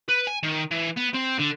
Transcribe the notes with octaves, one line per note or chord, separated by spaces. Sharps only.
B4
G#5
D#3
E3
B3
C4
D3